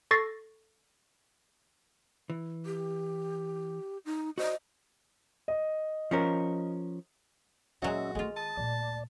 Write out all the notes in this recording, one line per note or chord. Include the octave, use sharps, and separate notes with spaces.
A4 C#6 A6 A#6 C7
E3
G4
D#4
F#4 C5 D5 D#5
D#5
F3 C#4 A#4
D2 A#2 F#3 G#3 C#4 F#4 D#5 E5
D#3 G#3 A3 C4 F4
A5 D#6
D2 A#2 D5